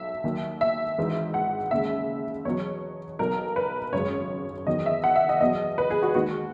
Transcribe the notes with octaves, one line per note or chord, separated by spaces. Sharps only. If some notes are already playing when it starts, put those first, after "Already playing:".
Already playing: B1 E5
D#2 D#3 F#3
E5
G#1 G#2 E3 G#3
F#5
D#2 C#3 G#3 E5
E2 B2 F#3 C#5
B1 B2 F#3 A#4
B4
G#1 F#2 C#3 G#3 C#5
E2 D#3 F#3 D#5
E5
F#5
E5
D#5
E2 B2 F#3 D#5
B4
G#4
F#4
D#2 D#3 G#3 F#4